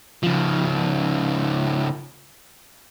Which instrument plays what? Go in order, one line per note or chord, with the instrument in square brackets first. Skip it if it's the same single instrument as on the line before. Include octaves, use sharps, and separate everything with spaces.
[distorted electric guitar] C#3 F3